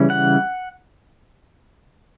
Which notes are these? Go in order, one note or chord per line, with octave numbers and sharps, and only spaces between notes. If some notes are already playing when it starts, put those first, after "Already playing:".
Already playing: C#3 E3 G3 C#4
F#5